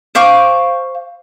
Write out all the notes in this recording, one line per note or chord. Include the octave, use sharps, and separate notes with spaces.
C5 F5 C#6 D6